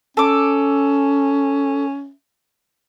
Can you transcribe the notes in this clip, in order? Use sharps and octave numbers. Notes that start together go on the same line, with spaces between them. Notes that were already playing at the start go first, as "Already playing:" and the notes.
C#4 A4 D6